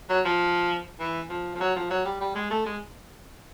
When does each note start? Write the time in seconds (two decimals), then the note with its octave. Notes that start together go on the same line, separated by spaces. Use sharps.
0.09 F#3
0.25 F3
0.99 E3
1.29 F3
1.55 F3
1.60 F#3
1.76 F3
1.90 F#3
2.05 G3
2.20 G3
2.35 G#3
2.50 A3
2.66 G#3